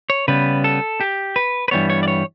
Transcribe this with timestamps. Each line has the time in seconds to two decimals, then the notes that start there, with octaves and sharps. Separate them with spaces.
0.10 C#5
0.28 C#3 G3 B3 B4
0.64 A4
1.01 G4
1.36 B4
1.68 B4
1.71 G2 E3 G3 B3 C#5
1.90 C#5
2.03 D5
2.08 C#5